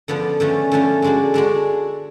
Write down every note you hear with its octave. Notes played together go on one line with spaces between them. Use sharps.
D3 F3 B3 D4
D3 F3 A3 C#4
D3 F3 A3 C#4
D3 G#3 D4 F#4
D3 G#3 D4 F#4